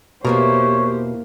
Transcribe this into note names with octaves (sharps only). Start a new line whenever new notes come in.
E2 B2 A#3 G4 A#4 C5 C#5